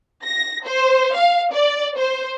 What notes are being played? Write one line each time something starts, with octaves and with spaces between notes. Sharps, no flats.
A#6
C5
F5
D5
C5